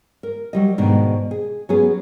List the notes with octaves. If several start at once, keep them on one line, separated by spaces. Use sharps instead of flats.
A#4
F#3 G3 D#5
G#2 B2 D#3 D4
G#4
F#3 B3 C#4 G#4